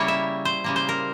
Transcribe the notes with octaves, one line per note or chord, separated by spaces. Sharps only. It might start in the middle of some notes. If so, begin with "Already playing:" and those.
Already playing: C#3 G3 A#3 E4 C#5
E5
C5
C#3 G3 A#3
C5
A#4